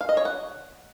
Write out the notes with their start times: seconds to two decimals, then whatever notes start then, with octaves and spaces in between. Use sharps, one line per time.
0.01 F5
0.09 D#5
0.17 C#5
0.25 F#5